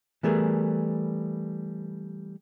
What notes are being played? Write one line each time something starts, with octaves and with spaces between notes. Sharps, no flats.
E3 G3 A3 B3 G#4 A#4